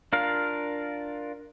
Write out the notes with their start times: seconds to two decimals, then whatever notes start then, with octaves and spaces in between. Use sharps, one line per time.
0.13 D4 F4 A#4 F5